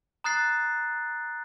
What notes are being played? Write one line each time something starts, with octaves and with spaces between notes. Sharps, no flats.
A#5 D#6 F#6 A6 C7